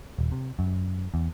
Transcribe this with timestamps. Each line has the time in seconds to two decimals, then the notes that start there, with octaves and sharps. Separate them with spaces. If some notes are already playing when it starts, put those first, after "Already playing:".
0.18 D#1
0.32 C3
0.59 F#2
1.14 E2